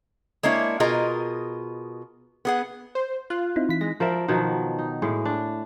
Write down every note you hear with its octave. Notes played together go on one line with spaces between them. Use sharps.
G#3 A#3 D4 E4 C#5
B2 F4 G#4 A#4 D#5 A#5
B3 G#4 F#5
C5
F4 F#6
C4 D#4 E4
E3 B6
G#3 A#6
F3 A#4 D5 E5
B2 D#3 F3 F#3
D#4
A2 G#3
D4